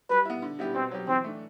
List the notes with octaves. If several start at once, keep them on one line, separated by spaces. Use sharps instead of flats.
G3 B4
B3 E4
D3
G3 B3 E4 G4
B2 C4
F#3 C4 G4
E3 C4
A3 D4